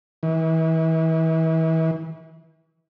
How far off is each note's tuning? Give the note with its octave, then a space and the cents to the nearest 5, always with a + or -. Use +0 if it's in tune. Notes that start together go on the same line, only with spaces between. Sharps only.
E3 -35